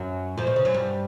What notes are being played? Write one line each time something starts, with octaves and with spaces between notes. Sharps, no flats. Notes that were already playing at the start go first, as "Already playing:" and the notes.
Already playing: F#2 F#3
F2 F3
B2
C#3
F#2 F#3
G2 G3